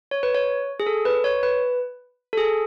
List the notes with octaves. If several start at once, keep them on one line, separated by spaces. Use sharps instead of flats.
C#5
B4
C#5
G#4
A4
B4
C#5
B4
A4
G#4